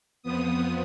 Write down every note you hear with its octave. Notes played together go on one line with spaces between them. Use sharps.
F2 F3 B3 D#6